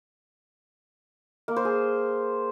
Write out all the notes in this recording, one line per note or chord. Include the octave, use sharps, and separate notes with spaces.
A#3
C5
G#4